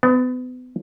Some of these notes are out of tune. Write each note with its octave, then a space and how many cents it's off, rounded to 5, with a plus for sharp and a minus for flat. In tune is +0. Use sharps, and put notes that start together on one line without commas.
B3 +35